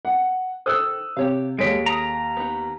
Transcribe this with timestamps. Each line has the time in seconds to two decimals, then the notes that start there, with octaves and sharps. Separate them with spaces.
0.05 F#5
0.66 D#3 A4 C5 D#6 E6 F#6
1.17 C3 G4 C#5 F5
1.58 D#2 G#3 G#4 A4 C#5 B6 D7
1.86 A#5 D#6
2.37 B3 D#4